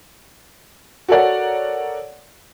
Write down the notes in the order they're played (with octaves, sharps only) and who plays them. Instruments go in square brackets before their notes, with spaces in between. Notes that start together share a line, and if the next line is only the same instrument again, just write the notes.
[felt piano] F#4 A4 A#4 C#5 D5 F#5